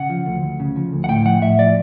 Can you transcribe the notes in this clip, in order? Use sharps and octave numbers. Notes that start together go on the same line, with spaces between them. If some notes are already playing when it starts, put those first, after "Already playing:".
Already playing: C#3 F#5
F3
D2
D2
C#3
F3
D2
F#5
A2 G5
F3 F#5
A2 E5
F3 D5